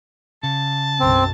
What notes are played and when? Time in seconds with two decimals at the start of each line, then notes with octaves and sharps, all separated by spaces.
0.43 C#3 A5
1.00 B1 F#2 C4